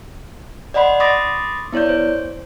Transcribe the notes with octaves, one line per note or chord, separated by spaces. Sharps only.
D5 D#5 F#5 B5 C6
B5 C6 D6 D#6 A6 A#6
B3 E4 C#5 D5 G6
C5